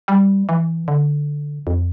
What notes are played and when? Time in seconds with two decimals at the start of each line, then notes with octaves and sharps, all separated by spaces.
0.08 G3
0.49 E3
0.88 D3
1.67 F2